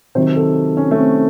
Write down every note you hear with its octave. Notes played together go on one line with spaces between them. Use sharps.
C3 D#3 F#3 C5
A4
C#4
A3
C4